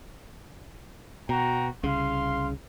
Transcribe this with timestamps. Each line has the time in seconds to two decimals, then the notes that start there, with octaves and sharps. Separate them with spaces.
1.29 B2 F#4 G5 A#5
1.83 C2 C#3 F5 C6